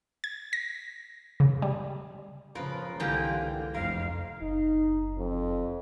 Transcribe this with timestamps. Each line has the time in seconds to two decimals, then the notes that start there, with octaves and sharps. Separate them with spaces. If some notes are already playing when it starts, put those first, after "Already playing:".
0.24 G#6
0.53 A#6
1.40 C#3
1.62 G3
2.55 C#3 F3 F4 A#4 B4
3.00 C2 G#2 D3 E3 A#3 F4 G4 G5
3.74 F1 F2 A#4 F5
4.41 F#1 D#4
5.18 F2